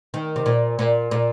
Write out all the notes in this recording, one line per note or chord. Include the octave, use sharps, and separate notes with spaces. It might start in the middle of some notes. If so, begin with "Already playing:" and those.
D#3
C3
A#2
A#2
A#2